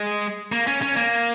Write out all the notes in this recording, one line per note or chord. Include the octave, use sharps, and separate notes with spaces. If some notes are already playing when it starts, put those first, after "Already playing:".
Already playing: G#3
A#3
C#4
C#4
A#3